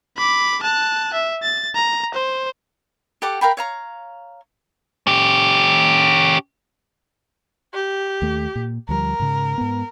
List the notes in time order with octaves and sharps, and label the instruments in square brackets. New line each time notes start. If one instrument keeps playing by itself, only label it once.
[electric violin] B5 D6
A5 F#6
E5
A6
A#5
C5
[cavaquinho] G4 A4 F#5 D6
A#4 F5 G5 B5
C#5 F5 A#5
[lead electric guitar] C#4 G4
[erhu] G4
[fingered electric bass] D#2 A3
A#2
[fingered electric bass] D2 F3 G3 [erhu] A#4
[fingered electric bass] G#2 C#3
G#2 B3